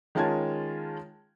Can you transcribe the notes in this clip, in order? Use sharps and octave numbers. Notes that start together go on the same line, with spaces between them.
D#3 G#3 C#4 F4 A5 G#6